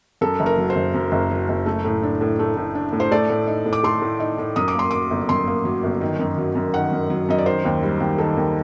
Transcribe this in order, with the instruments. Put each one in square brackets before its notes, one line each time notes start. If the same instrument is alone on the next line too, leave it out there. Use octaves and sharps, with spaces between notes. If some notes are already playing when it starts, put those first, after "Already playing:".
[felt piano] F#2 A4
F#1
A#4
F#3
C5
F#1
F#2
F#1
F#3
F#1
A3
A2
D4
A2
A3
A2
D4
A2
C5
A3 D5
A2
D#4
A2
D6
A3 C6
A2
D#4
A2
F#2 D#6
D6
A#3 C6
F#3 D6
G1
F#2 C6
A#3
F#3
G1
D#3
F#2
F#3
F#2
D#3 F#5
F#2
F#3
F#2 D#5
D5
D#3 C5
D#2
G3
D#2
D#3 A4
D#2